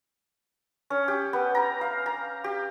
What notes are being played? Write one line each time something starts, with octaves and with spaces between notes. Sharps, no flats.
C#4
G4
B3
A#5
F5
A#5
G4